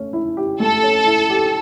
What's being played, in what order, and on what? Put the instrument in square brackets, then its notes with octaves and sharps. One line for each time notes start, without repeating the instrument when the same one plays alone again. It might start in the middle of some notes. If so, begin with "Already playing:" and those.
Already playing: [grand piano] A3 C#4
E4
G4
[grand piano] A3 [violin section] A4
[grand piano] C#4
E4
G4